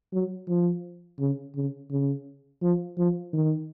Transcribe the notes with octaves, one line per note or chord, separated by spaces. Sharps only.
F#3
F3
C#3
C#3
C#3
F3
F3
D#3